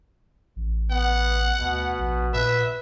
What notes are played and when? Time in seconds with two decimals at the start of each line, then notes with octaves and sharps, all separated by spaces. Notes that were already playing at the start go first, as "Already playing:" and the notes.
0.56 A1
0.91 B3 F#5
1.60 D2 B2
1.99 A#1
2.34 A#2 B4 E5